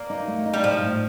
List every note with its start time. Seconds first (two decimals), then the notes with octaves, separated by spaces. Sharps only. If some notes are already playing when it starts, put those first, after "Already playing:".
Already playing: A#3 D5
0.10 D#4
0.28 A3
0.46 D#4
0.54 G3
0.63 A2 F3
0.82 A2